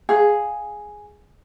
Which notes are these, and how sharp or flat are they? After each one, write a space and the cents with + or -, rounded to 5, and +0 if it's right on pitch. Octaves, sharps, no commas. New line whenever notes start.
G#4 +0 F5 +15